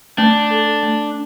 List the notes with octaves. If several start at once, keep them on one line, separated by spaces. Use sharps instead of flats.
A3 D4
A4
A3